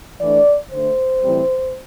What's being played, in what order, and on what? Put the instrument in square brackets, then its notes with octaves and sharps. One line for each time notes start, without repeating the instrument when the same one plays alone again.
[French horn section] E3 A3 D4 D5
D3 A3 D4 C5
A2 E3 G3 C4